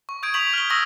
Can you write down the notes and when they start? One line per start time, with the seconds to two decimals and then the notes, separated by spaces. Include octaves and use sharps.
0.09 C#6
0.23 D#6 G6 G#6 D7
0.34 C#6 B6 F7 F#7
0.53 F6 G7
0.70 C#6 D#6 E6 A#6 F#7